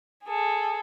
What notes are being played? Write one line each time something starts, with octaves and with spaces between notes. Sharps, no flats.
G#4 A4